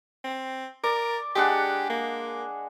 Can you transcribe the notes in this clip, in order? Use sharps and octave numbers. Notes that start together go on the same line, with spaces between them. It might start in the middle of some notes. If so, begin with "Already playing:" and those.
C4
A#4 D5
G#3 D4 G4 F#5
A#3